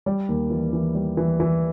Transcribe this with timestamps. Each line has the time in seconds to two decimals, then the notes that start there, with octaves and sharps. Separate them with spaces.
0.06 G3 D5
0.29 D#2
0.50 E3
0.73 E3
0.95 G3
1.17 E3
1.40 E3